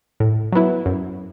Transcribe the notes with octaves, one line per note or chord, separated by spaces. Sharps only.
A2
F#3 B3 E4
F#2